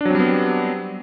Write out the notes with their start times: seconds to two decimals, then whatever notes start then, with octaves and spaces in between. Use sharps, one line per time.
0.01 D4
0.05 F#3
0.10 C4
0.15 G3
0.20 B3